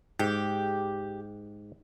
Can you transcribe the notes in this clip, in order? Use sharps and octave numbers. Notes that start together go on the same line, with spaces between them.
G#2 G4